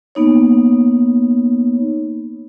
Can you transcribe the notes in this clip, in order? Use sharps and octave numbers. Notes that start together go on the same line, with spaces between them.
A#3 B3 D#4 C#5